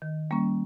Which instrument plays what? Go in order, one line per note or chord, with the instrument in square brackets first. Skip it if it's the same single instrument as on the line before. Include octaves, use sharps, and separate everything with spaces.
[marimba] D#3
G3 A#3 C#4